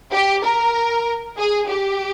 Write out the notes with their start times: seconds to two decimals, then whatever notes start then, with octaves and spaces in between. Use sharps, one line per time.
0.12 G4
0.43 A#4
1.37 G#4
1.69 G4